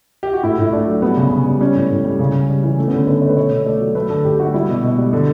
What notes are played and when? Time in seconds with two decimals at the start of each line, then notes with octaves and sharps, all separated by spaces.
0.23 G4
0.33 F#4
0.43 A2 E4
0.58 A2 E4
0.72 A3 D4
0.87 F#3
1.02 G3 B3
1.17 C#3
1.31 C#3
1.46 G3
1.60 G3 C#4
1.76 A2
1.91 A2
2.05 G3
2.19 C#3
2.34 C#3
2.49 G3
2.63 E3
2.78 A3 C#4
2.88 B3
2.93 D3 C#4
3.07 D3 B4
3.22 A3 C#5
3.29 B4
3.37 B2 C#5
3.51 B2
3.66 A3 D5
3.81 F#3
3.95 A3 B4
4.10 D3 A4
4.25 D3 G4
4.39 A3 F#4
4.54 G3 E4
4.69 B2
4.83 B2
4.98 G3
5.13 D3